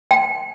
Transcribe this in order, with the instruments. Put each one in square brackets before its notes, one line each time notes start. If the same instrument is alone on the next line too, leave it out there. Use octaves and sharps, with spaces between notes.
[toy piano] G5